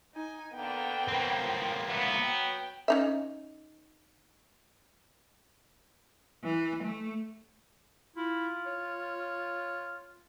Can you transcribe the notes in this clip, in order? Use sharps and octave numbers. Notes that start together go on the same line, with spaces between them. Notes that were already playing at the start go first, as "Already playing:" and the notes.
D#4 G#5
D3 A#3 B3 G5
E2 E3 A#3 C4
A2 C#3 F3
F#3 B3 E5 F#5
G5
C#4 D#4 E5
E3
A3
E4 F4
C#5